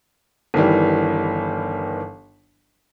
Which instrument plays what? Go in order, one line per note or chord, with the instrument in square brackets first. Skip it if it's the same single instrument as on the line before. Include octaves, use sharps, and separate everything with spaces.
[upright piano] G1 D#3 E3 G3